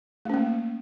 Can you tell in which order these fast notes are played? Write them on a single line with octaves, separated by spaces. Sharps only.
A3 C#4 A#3